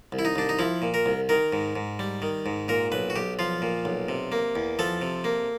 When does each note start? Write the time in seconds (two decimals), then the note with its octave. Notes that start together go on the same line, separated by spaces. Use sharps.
0.12 C2
0.19 E4
0.25 D#4
0.36 C2 D4
0.49 D#4
0.59 F3 E4
0.82 A#2
0.94 A#4
1.06 C2
1.29 D#3 A#4
1.53 G#2
1.76 G#2
1.99 G3
2.22 D#3
2.46 G#2
2.68 A#2 A#4
2.92 B1 B4
3.10 F#4
3.16 B1 G4
3.39 F3 F4
3.62 A#2
3.85 B1
4.09 C3
4.32 A#3
4.56 E2
4.79 F3 A4
5.02 C3
5.24 A#3